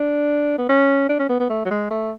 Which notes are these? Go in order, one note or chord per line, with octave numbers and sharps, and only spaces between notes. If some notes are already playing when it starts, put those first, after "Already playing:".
Already playing: D4
B3
C#4
D4
C#4
B3
B3
A3
F#3
G#3
A3